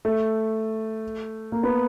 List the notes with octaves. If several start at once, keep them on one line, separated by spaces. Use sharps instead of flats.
A3
A#3
B3